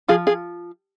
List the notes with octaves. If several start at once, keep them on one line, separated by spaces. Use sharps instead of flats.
F3 F4 G#4
F4 G#4